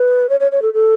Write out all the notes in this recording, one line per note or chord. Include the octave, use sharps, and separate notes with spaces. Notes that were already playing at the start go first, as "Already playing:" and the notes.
Already playing: B4
C#5
C#5
C#5
A4
A4